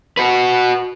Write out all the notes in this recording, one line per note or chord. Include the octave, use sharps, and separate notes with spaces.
F#4 B4